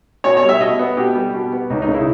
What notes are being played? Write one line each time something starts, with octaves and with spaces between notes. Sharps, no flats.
B2 C#5
C#5
G3
E5
B2 D#5
B3
B2 G4
G3
B2
B3
C#2 D#4
D#4
C#3
E4